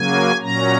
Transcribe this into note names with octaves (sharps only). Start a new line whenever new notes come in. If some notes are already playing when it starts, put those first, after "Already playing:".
Already playing: C#3 F#3 A#3 G#5
A#2 F#3 C#4 A#5